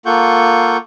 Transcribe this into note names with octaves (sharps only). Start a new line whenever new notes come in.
A#3 F4 A4 F#5 C#6 G6